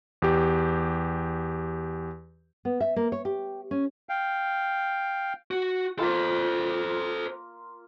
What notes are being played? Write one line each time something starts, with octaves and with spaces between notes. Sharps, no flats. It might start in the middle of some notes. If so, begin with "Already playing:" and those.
E2 G4
B3
E5
A#3
C#5
G4
C#4
F5 G5
F#4
A#3 F4 A4 C5 C6